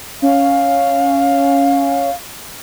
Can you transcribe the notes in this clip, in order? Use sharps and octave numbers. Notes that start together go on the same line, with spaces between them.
C#4 F5